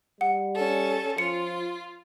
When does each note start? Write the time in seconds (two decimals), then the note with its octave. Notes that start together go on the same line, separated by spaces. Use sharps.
0.21 G3 F#5
0.54 C#4 A4
1.18 F3 F4 C#7